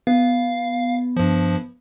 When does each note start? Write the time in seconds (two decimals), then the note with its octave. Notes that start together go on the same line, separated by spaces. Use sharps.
0.07 B3 F5
1.17 G2 F3